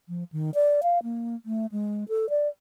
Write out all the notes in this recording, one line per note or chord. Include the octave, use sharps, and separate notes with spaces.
F3
D#3
D5
F5
A#3
A3
G#3
A4
D5